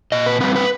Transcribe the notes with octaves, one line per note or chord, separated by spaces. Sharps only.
A#2 D#5
B4
G3 C4 B4
B4